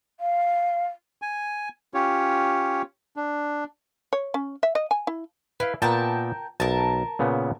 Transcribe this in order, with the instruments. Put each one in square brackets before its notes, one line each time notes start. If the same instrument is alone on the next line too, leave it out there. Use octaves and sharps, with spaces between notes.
[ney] F5
[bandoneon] G#5
C#4 F4 G4 C#5
D4
[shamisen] C#5
C#4
E5
D#5
G#5
E4
[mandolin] E4 [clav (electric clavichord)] B4 F5
[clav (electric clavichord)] A#2 B3 [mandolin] A#4 G5 A5
[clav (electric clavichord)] B1 [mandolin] A#4 A5
[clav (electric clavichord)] A#2 C#3 B3